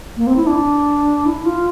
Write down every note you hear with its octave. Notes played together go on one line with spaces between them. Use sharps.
A#3
C4
E4
D4
E4
F4